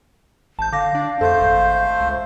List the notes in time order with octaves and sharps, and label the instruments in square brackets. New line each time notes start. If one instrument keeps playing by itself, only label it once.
[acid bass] G#1 [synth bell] A5 G6
[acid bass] D3 [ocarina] F5 [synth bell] D6 A#6
[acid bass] D4
[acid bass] F2 [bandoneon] A3 C5 [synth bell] A4 G6
[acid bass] G#1
C#2